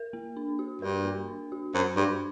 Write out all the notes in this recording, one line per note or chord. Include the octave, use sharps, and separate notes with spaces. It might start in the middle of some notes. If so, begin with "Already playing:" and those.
Already playing: A#4
A#3
D4
F#4
G2 A#4
A#3
D4
F#4
F#2 C5
G2 D4